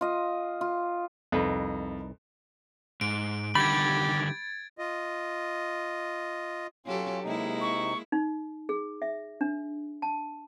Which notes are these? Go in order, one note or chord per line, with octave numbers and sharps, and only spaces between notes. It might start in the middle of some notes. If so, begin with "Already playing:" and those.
F4 D#5
F4
C2 F2 D#4 B4
G#2 D7
D3 D#3 G3 G4 B5 G#6 A6
F4 D#5
F#3 C#4 F4 G4 A4
C3 G#3 A#3 D#4 E4
C#6
D#4
G#4
E5
D4
A5